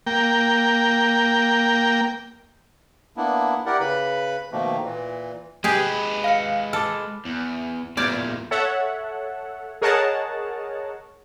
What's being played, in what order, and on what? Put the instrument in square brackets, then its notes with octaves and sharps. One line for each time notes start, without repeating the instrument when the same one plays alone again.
[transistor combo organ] A#3 G5
[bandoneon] A#3 B3 D4 E4
E4 G4 A#4 D5 F#5
C#3 B4 B5
B2 D#3 F3 A3 A#3
A#2 E3
[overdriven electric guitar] G#3 B4 [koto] G4 G#4
[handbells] F5 F6 C#7
[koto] A4 [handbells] D6 F6
[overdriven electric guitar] E2
[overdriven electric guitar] E2 A#2 [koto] D5 [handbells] F6 G6 G#6
[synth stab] A4 C#5 E5 F#5
G#4 A#4 C#5 D#5 F#5 A5